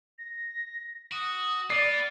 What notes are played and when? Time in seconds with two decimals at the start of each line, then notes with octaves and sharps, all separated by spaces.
0.18 A#6
1.12 F#4 D#6
1.70 B3 D5 F6 C7